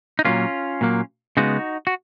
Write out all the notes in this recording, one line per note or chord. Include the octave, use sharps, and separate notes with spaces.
D#4
A#2 F#3 A#3 C#4 F4
A#2 F#3 A#3
C#3 G#3 B3 D#4 F#4
F#4